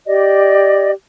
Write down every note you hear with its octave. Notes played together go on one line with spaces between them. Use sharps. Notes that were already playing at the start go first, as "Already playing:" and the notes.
G4 D5 D#5